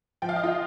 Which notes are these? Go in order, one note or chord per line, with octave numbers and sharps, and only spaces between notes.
F3 G5
F5
D#5
F4 F5